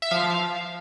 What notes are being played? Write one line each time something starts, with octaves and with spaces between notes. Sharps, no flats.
E5
F3 F5